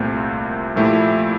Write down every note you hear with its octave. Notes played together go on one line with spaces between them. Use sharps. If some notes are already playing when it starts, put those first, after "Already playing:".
Already playing: C2 A#2 A3 C4
A#2 F3 A3 E4 G4